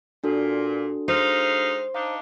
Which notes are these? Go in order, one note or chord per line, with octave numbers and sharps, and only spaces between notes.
A#2 D4 F#4 A4
G#3 D#4 C5 F5
D4 D#4 F5